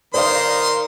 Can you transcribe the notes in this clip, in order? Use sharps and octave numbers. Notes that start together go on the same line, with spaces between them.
D#3 A#4 C5 D5 F5 C6